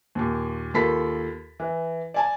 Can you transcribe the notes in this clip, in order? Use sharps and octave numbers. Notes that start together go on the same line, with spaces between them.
D#2 A#2
D#2 F4 A4 A#4 B5 B6
E3
D5 G#5 A5